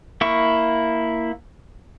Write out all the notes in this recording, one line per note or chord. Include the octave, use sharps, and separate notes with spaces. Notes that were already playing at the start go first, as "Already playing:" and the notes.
A#3 E4 C#6